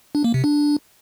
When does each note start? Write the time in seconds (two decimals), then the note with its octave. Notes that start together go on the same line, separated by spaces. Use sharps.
0.15 D4
0.24 A#3
0.34 C3
0.44 D4